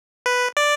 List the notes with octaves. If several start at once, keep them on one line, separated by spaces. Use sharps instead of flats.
B4
D5